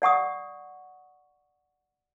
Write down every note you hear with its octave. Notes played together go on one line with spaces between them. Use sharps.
D5 F#5 C#6 D#6